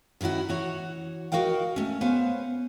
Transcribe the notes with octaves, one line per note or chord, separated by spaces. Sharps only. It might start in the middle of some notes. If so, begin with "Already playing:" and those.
D#3 F#3 C#4 E4 F#4
E3 F#4 C#5
F#4 A#4 D#5 F5 G5
A3 C#4
B3 C5 C#5 F5 G#5